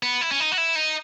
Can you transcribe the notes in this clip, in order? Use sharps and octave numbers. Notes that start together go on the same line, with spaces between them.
B3
E4
C#4
D#4
F#4
E4
D#4